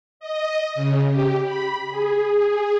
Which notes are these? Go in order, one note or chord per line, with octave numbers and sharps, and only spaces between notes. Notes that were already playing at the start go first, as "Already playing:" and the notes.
D#5
C#3
G4
B5
G#4
G#4